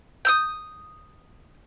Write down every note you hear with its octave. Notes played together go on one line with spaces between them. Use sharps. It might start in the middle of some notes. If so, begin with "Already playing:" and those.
D#6 E6 G6